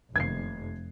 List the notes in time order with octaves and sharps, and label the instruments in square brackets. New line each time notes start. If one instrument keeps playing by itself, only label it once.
[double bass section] F1 [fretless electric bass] F#2 D#3 A#3 [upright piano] G#6 C7